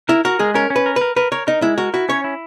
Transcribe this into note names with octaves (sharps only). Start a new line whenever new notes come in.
E4 A#4
F#4 A#4
G#3 G#4
C#4 A#4
C#4
B4
A#4
B4
A#4
A#4 B4
A#4 C#5
D#4 A#4
G#3 E4
F#4 A#4
E4 F#4
C#4 C#5
E4